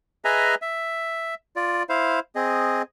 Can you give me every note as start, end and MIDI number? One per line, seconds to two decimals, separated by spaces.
0.25 0.55 68
0.25 0.55 71
0.25 0.55 75
0.25 0.55 76
0.25 0.55 80
0.25 0.55 82
0.62 1.34 76
1.56 1.83 65
1.56 1.83 74
1.89 2.20 64
1.89 2.20 72
1.89 2.20 77
2.35 2.82 60
2.35 2.82 68
2.35 2.82 75